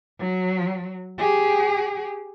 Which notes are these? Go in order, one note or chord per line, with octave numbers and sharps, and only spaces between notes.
F#3
G4 G#4